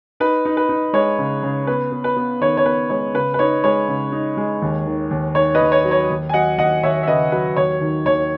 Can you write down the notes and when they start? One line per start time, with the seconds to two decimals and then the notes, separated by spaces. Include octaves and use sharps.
0.20 D#4 B4
0.45 D#4
0.57 B4
0.69 D#4
0.93 G#3 C#5
1.18 C#3
1.43 C#3
1.67 B3 B4
1.92 B3
2.04 B4
2.17 B3
2.41 D#3 C#5
2.57 C#5
2.66 B3 B4
2.90 G#3 C#5
3.14 C#3 B4
3.34 B4
3.39 D#4 C#5
3.64 G#3 C#5
3.88 C#3
4.12 D#4
4.37 G#3
4.62 D#2
4.86 D#3
5.11 D#2
5.35 D#3 C#5
5.55 B4 D#5
5.61 D#2
5.72 C#5
5.84 F#3
5.91 C#5
6.10 D#2
6.29 G#5
6.33 F#3 D#5 F#5
6.58 D#2 D#5 F#5
6.83 D#2 C#5 E5
7.03 E5
7.07 C#3 B4 D#5
7.32 F#3 B4
7.56 D#2 C#5
7.81 D#3
8.05 D#2 C#5